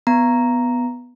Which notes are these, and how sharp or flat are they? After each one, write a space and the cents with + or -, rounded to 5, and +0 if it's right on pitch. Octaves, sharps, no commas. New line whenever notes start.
B3 +0 A#5 +0